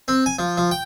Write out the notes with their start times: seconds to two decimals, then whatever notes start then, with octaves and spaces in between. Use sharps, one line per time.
0.08 C4
0.26 G#5
0.39 F3
0.58 F3
0.71 G5